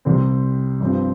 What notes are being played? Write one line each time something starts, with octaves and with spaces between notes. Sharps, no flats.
C2 C3 G3 C4
G2 F3 C4